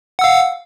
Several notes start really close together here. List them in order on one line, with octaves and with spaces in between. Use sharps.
F#5 E6 F5